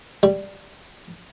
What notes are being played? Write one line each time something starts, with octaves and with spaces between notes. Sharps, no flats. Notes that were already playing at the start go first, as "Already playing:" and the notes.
G3